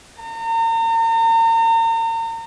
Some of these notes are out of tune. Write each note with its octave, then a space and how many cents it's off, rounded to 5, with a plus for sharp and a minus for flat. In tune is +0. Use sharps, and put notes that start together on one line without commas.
A#5 -40